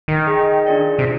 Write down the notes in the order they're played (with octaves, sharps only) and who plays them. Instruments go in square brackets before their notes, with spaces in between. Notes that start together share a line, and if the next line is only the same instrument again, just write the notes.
[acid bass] D#3
[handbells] G#4 D#5 G5
D4 F4 G#4 D5
[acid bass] C3